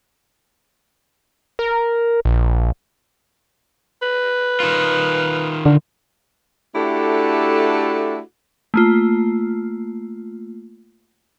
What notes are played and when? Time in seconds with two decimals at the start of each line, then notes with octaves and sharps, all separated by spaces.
1.59 A#4
2.25 A#1
4.02 B4
4.60 D#3 F4
5.66 D3
6.75 A3 D4 E4 F#4 G4 A4
8.74 A3 A#3 F4